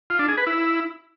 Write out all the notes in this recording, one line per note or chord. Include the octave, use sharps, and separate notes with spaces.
F4
D4
G#4
B4
E4